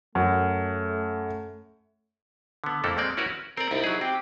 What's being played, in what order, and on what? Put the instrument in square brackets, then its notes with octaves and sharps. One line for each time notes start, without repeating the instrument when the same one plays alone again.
[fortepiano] F#2 [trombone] A3
[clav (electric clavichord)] D3 B3
F2 A3 A#3 E4 A4
G#3 A#3 C4 D5
C#4 E4 F#4 A#4 B4
[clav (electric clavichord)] C4 D5 [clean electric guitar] A#4
[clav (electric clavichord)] C2 [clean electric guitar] D#4 E4
[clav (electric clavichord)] F#3 G#4
[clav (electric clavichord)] C4 [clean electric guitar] G4